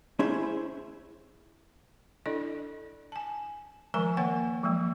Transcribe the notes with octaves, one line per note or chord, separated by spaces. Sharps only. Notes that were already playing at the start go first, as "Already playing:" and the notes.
C#4 E4 G#4 C5 E5
D4 E4 A4 D5 D#5
G#5 A5
D#3 F3 G#3 A#4 G#5 A#5
D#3 A#3 C#5 F#5 G#5
F3 F#3 G#3 A#3